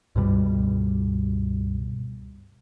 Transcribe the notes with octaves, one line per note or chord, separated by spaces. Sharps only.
C#2 G2 B2 G3